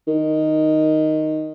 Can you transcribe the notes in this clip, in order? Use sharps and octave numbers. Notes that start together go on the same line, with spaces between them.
D#3